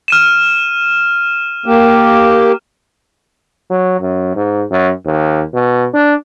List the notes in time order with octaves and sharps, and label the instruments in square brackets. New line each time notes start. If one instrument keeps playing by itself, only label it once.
[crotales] F6 D#7 E7
[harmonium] A#3 G4
[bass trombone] F#3
F#2
G#2
F#2
D#2
B2
D4